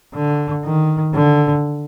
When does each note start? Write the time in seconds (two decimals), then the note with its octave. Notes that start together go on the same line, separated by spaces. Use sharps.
0.15 D3
0.64 D#3
1.14 D3